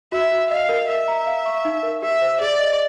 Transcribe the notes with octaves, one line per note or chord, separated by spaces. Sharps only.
F#4 E5
F#4
D#5 F5
A#4
A#4 E5
A#5
F5
C#6
D#4
A#4
G4 E5
C5
G#4 D5
D#5